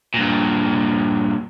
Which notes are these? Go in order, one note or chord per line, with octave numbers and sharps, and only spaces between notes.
G2 A#2